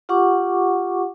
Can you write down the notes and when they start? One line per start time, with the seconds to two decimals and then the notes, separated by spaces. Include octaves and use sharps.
0.09 F4 G4 F#5 C#6 D6